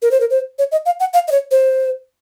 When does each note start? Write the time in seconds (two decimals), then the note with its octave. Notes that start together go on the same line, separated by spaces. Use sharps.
0.02 A#4
0.11 C5
0.20 A#4
0.30 C5
0.59 C#5
0.72 D#5
0.86 F5
1.00 F#5
1.13 F5
1.28 D#5
1.32 C#5
1.51 C5